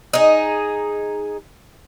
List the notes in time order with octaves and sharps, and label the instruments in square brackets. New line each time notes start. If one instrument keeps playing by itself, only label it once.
[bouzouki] D#4 G#4